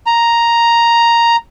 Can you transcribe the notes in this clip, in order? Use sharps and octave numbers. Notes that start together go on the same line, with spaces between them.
A#5